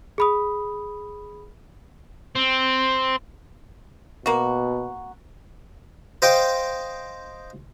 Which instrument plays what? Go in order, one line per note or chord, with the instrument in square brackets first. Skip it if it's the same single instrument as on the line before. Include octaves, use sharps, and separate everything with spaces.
[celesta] G#4 B5 D#6
[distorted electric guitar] C4
[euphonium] B2 [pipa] A#3 F#4
[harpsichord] C5 D#5 F5 G5 C6 D6